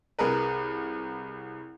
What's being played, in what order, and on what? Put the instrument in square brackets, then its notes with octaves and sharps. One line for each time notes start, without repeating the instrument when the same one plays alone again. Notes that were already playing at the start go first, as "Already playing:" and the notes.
[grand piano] C2 G#4 A#4 B4